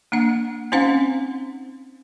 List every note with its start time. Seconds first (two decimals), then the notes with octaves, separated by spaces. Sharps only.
0.12 A#3 D4 F#5
0.72 C4 C#4 D#4 C5 F5 F#5